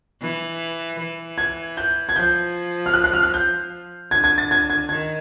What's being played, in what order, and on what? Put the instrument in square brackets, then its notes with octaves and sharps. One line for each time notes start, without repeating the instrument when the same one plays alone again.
[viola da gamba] E3
E3
[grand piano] G#6
G6
G#6
[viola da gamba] F3 [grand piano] G6
[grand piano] F6
F#6
F#6
F6
F#6
G6
[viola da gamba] D3 [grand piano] G#6
[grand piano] G#6
A6
G#6
G#6
[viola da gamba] D#3 [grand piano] G#6